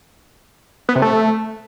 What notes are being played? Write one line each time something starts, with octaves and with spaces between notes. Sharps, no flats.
B3
C3
A3